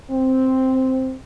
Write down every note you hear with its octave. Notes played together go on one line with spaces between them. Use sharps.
C4